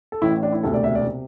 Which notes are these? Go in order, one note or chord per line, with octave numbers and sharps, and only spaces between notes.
A4
A1 A2 E3 E4
D4
E4
E1 D2 C3 A4
D5
E5
D5
C3